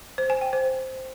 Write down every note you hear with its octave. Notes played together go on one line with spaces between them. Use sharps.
C5
G#5
G5
C5